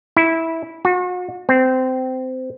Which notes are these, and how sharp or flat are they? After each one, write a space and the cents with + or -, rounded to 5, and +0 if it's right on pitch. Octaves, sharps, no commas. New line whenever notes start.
E4 -10
F#4 -40
C4 -20